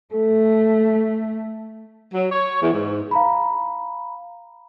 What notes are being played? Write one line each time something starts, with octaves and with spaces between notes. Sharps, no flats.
A3 A4
F#3
C#5
E2
G#2
F5 A#5 B5